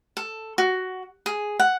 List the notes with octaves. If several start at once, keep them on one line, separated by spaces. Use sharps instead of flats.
A4
F#4
G#4
F#5